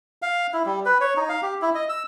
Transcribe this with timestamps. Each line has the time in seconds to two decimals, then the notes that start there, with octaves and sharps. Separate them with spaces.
0.22 F5
0.54 E4
0.66 G3
0.86 B4
1.01 C#5
1.17 D#4
1.29 F5
1.42 G4
1.62 E4
1.75 D#5
1.89 E6